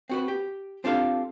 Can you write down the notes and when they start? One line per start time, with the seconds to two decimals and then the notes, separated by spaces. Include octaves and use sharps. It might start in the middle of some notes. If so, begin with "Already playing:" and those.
0.09 C4 F#4 B4
0.28 G4
0.84 C4 D4 F4 G4 A4 F5